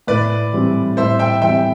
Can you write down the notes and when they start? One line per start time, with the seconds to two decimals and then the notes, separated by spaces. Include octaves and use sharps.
0.07 A2 B4 D5
0.53 E3 G3 C4
0.97 A2 C5 E5
1.19 E5 G5
1.42 E3 G3 C4 E5 G5